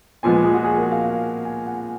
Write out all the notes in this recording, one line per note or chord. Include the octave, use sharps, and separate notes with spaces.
A#2 F3 G#3 B3 G#5
G#4
F#4
G#4
A#4
F5
G#5
F#5